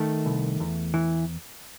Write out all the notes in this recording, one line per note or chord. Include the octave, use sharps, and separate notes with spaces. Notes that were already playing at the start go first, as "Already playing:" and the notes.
Already playing: D#3 A3
C2
E2
E3